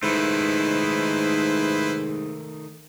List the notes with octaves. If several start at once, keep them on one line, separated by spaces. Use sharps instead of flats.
G#2 D#3 A3 E4 B4 C5